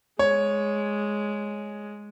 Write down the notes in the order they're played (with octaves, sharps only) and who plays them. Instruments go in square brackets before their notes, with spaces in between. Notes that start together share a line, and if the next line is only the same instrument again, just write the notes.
[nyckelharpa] G#3 [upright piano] C#5